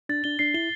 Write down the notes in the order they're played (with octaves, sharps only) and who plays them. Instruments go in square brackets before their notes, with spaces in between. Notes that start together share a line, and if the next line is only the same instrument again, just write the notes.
[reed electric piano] D4 [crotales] A6
[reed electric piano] D4 [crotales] G7
[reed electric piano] D4 [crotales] C7
[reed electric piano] E4 [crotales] G7